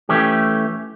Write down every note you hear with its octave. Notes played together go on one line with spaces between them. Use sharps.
E3 A3 C#4 G4